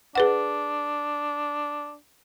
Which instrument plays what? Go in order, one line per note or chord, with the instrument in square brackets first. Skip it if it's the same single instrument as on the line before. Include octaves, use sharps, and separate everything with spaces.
[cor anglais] D4 [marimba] G#4 B4 F#5